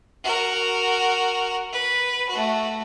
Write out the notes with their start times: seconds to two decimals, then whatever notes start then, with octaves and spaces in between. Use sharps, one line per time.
0.24 F#4 A#4
1.73 B4
2.29 A3 F#4